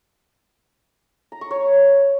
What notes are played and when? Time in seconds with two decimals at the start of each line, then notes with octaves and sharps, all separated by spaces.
1.32 A#5
1.41 C#6
1.51 C#5